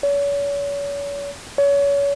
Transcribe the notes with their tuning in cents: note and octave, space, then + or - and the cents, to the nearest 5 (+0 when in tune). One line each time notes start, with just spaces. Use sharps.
C#5 +40
C#5 +30